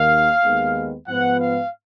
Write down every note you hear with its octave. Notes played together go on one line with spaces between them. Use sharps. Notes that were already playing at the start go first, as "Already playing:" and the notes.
Already playing: D#2 D#3 A#3 F5
D#2 D#3 G#3 B3
G#2 F3 B3 F#5
F5